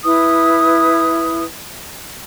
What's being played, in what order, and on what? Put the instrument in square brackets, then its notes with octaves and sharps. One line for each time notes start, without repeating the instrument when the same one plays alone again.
[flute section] E4 B4 D#6